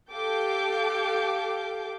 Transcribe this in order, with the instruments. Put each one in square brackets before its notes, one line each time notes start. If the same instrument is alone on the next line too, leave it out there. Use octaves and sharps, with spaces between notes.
[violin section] G4 A4 F5 D6 G6